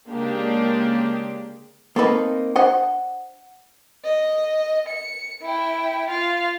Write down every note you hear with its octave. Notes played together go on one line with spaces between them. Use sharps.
C#3 G#3 A#3 D4 G4
A#3 C4 D#4 A4 B4
D4 C5 D#5 F#5
D#5
C#7
E4 G5
F4 F5